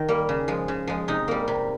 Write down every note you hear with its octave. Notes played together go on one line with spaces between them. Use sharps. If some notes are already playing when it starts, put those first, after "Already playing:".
Already playing: D#3
G3 A#3
C#3
F3 G#3
C#3
F3 G#3
C3 D#4
G3 A#3
C3